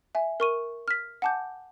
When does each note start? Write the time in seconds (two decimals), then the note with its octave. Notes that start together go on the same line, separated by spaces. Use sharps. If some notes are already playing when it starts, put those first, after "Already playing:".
0.15 E5 G#5
0.40 A#4 C#6 D#7
0.88 F6 B6
1.22 F#5 G#5 A5 D6 G6